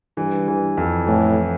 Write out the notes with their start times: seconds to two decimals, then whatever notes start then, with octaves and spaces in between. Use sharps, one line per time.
0.17 G2 E3
0.48 E3
0.77 F2
1.07 A2 E3